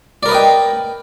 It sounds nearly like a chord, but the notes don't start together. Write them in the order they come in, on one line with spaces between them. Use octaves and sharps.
D5 A#4 B4 D#5 G5